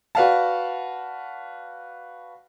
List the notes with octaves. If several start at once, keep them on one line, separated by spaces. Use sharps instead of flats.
F#4 B4 D5 F5 F#5 A5